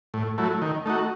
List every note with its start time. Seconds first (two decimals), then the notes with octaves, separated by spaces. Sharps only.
0.14 A2
0.38 F#3 A3 E4
0.62 D#3
0.86 A3 D#4 F#4